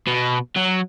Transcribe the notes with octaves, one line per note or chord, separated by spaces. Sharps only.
B2
F#3